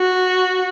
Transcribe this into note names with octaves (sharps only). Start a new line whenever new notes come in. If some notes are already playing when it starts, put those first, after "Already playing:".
Already playing: F#4